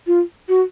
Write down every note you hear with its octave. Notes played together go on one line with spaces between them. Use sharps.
F4
F#4